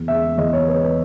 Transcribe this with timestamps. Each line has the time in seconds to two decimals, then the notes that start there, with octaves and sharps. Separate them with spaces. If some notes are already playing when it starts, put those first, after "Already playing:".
Already playing: E2
0.08 C#3 G#3 E5
0.38 E2 D#5
0.53 C#5
0.68 C#3 G#3 B4
0.83 B4